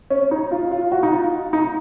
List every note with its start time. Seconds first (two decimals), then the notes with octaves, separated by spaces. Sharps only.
0.10 C#4
0.31 D#4
0.51 F4
0.71 F4
0.92 F#4
1.03 D#4
1.12 F4
1.53 D#4